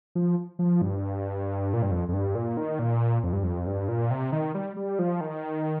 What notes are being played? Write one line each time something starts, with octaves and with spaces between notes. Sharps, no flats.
F3
F3
G2
A#2
G2
F2
F2
G2
A#2
D#3
A#2
F2
G2
F2
G2
A#2
C3
D#3
G3
G3
F3
D#3